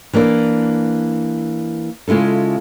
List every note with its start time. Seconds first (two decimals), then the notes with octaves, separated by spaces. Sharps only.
0.13 E3 A#3 D4 D5
2.08 C#3 G#3 E4 F4 A4